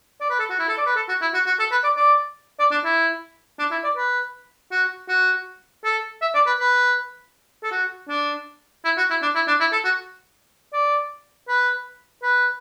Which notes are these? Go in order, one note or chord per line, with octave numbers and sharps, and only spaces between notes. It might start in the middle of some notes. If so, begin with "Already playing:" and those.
D5
B4
A4
F#4
E4
A4
D5
B4
A4
F#4
E4
F#4
F#4
A4
B4
D5
D5
D5
D4
E4
D4
E4
D5
B4
F#4
F#4
A4
E5
D5
B4
B4
A4
F#4
D4
E4
F#4
E4
D4
E4
D4
E4
A4
F#4
D5
B4
B4